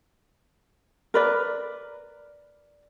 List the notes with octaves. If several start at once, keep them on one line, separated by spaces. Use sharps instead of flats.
A#4 B4 D5